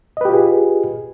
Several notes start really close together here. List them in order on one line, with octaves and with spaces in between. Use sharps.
D#5 B4 G4 F4 G#4